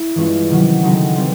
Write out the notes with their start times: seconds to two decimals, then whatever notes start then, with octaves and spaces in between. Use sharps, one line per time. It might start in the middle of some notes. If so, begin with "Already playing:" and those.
Already playing: E4
0.15 G2 E3 G#3 C#4 F4
0.50 C3 D#3 F#3
0.83 C#3 F#3 A3 C4 D#4
1.16 E3 G3 C4